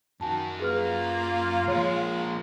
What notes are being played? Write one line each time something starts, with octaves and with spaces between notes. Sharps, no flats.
F#2 D#3 F#4 G#5 A5
A#3 F4 G#4 B4 F6
F3 G#3 A#3 C#5 A#5